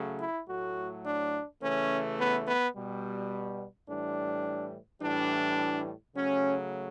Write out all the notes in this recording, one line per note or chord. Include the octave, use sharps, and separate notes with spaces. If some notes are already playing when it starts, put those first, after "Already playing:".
Already playing: C#3 F#3 A3
E4
A2 F#3 A3 F#4
D4
C#3 E3 A3 C#4
B3
B3
B2 G3
A2 E3 G3 D4
A2 E3 G3 D4
C#3 F#3 A3 C#4